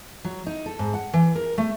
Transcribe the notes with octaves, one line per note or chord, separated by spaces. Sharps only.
F#3
D#4
A4
G#2
F#5
E3
A#4
A3